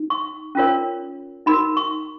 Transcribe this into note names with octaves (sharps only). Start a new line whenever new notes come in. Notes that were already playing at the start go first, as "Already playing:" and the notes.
Already playing: D#4
C#6
C#4 F4 A#4 C#5
D#4 F#4 A#4 B5
C#6